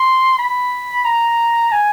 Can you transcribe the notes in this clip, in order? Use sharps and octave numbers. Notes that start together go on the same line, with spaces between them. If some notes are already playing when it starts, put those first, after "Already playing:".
Already playing: C6
B5
A#5
G#5